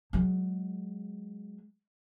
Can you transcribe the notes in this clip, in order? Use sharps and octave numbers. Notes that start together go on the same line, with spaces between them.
F#3 G#3